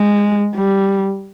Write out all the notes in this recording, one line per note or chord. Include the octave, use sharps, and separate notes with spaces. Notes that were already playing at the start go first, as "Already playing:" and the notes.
Already playing: G#3
G3